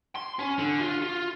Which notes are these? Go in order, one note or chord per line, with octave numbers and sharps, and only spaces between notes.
C6
C#4
D3
F4
F4